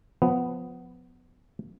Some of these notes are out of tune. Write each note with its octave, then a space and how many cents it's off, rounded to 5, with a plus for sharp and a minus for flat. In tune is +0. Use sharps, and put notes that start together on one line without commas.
F3 +25 B3 +10